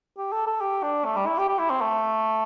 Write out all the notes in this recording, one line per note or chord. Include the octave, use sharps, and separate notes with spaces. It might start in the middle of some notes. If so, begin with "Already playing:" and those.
G4
A4
A4
G4
D4
A3
G3
E4
G4
G4
E4
C4
A3